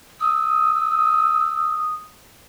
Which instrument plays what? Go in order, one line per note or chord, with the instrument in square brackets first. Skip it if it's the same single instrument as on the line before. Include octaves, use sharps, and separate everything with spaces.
[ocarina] D#6 [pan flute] E6